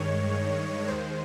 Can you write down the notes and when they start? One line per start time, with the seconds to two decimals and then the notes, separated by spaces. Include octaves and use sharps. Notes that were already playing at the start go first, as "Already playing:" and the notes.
Already playing: G2 D#3 G#3 C#5
0.88 D#2 D#3 G#3 C5